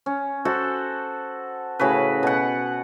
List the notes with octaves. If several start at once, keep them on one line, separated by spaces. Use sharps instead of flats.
C#4
F#4 A4 C5 F#5
A2 C#3 F#4 B4
B2 F#5